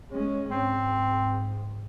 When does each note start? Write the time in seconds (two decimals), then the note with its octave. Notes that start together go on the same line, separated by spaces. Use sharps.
0.11 G#3 C#4
0.51 G#2 C4